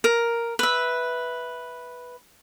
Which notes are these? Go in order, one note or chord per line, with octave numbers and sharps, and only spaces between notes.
A#4
B4 E5